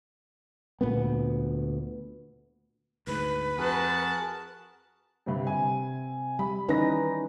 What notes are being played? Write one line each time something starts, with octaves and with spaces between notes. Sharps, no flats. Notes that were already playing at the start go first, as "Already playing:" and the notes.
D2 A#2 A#3 B3
D2 G#2 B4
F2 F#4 G#4 A#4 A5 F#6
G2 C3 G3
C3 G#5
G3 B5
D#3 E3 C#4 D#4 B4 A#6